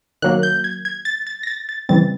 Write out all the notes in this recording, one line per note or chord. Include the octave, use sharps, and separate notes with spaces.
D#3 F#3 A#3 F#6
G6
G#6
G#6
A6
A6
A#6
A6
A6
C#3 E3 G3 C4 A6